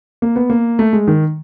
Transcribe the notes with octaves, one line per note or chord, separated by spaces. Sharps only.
A#3
B3
A#3
A3
G#3
D#3